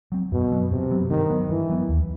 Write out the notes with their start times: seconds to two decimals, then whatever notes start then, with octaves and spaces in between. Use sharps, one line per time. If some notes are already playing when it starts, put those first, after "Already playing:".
0.12 F#3 C4
0.32 F#2 B2
0.52 F#3 B3
0.71 F#2 C3
0.91 F#3 B3
1.10 G2 D#3
1.30 F#3 B3
1.49 G2 E3
1.70 F#3 B3
1.89 D#2